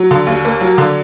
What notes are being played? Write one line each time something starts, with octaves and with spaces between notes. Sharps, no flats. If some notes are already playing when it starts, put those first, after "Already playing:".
Already playing: F#3
D3
D#2
A#3
F#3
D3